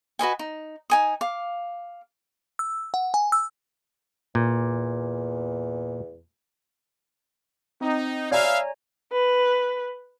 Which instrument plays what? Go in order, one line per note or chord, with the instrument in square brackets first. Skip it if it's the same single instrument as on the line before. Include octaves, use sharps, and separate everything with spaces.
[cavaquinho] F#4 B4 D#5 G#5
D#4
D#4 G#5 D#6
F5 D6
[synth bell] E6
F#5
G#5
E6
[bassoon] E2 [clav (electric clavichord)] A#2
[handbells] C4 [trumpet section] D#4
[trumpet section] B4 E5 F5 [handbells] C#5 G#5 A#5 [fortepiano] D5
[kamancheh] B4